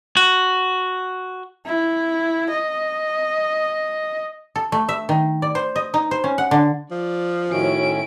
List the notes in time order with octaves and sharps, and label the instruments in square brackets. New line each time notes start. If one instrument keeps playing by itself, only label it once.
[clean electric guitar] F#4
[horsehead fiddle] E4
D#5
[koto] A4
A3
E5
D#3
D5
C5
D#5
D#4
C5
C#4
F#5
D3
[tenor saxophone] F3 [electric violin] D5
[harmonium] A2 D#3 C#4 [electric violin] E4 D7 [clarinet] F#4